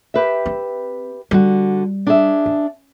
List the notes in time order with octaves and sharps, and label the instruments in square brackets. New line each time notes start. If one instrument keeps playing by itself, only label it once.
[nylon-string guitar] G4 B4 E5
[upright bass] C4
[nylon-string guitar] D3 F#4 [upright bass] G3
[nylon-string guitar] D4 G#4 E5
[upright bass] C#4